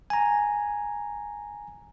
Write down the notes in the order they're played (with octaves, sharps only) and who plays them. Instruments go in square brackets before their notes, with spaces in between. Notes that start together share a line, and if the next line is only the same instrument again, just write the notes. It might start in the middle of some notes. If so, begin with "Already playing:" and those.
[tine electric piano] G#5 A#5